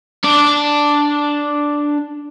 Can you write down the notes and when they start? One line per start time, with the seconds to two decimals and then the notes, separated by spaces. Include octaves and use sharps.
0.24 D4 D5